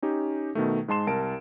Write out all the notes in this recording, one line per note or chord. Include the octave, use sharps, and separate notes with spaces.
C#4 D#4 G4
B2 D#3 A3
G#2 G#3 A5 C6 E7
C2 A#4 A5 D7